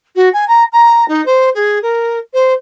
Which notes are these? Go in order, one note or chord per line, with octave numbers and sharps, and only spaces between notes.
F#4
G#5
A#5
A#5
D#4
C5
G#4
A#4
C5